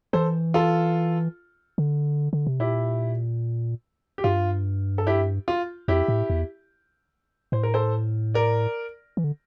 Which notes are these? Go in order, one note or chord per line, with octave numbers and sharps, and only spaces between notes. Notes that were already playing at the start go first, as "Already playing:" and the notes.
E3 A4 C5
F4 A4
D3
D3
C3
A#2 E4 G4
G4
G2 F4
A4
E4 G4
F4
F2 E4 G4
A2
E2
A2 C5
A#4
A4 C5
A#4 D5
E3
D3